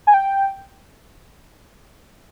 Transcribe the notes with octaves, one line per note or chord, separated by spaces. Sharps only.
G#5
G5